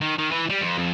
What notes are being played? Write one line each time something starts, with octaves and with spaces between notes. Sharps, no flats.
D#3
D#3
E3
G3
F2
F2